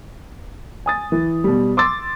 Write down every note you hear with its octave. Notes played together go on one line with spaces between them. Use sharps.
G#5 D#6 A6
E3
B2 G3
C6 D6 E6 A6